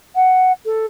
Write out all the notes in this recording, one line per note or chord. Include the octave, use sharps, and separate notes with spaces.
F#5
A4